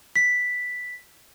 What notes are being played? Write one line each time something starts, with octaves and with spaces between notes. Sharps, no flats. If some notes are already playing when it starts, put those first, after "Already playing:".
B6